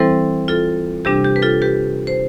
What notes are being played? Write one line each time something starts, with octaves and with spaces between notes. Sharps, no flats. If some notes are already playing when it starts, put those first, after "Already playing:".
Already playing: E3 G3 C4 E4 A4 C5
F4 A4
C3 G3 D4 G4
G4
B4
F4 A4
G4 B4
C5